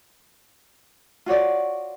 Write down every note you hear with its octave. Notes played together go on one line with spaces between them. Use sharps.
F4 F#4 C#5 D5